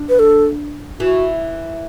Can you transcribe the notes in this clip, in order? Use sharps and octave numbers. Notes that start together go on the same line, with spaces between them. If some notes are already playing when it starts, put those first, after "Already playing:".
Already playing: D4
B4
A4
E3 F#4